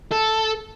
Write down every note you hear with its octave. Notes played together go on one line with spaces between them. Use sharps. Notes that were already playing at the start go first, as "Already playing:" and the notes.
A4